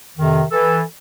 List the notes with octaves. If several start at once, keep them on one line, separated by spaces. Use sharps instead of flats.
F2 C3 D#3
E3 A4